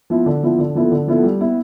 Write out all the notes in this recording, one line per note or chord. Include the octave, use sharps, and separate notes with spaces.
F3 B3 E4
D3
F3 B3 E4
D3
F3 B3 E4 A4
D3
F3 B3 E4 A4
G3
B3 E4